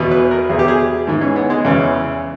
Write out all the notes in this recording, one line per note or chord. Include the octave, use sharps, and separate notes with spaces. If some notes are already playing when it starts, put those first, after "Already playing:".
Already playing: E2 B2
B4
A#4
E2 B2 G#4
G4
G#4
G#2 E3
C#4
B3
G#3
E2 C#3 E3